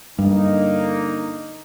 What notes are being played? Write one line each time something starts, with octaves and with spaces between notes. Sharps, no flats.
G2 D3 A#3 D#4